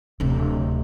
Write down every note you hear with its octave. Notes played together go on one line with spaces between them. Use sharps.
D1 C3